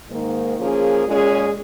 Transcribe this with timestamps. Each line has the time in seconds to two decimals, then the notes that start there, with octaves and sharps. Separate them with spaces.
0.10 G#2 D#3 A#3
0.58 F3 A#3 C#4 G#4
1.06 A#2 G#3 C#4 G#4